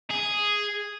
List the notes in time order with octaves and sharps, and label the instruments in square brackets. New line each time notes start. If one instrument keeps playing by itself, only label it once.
[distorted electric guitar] G#4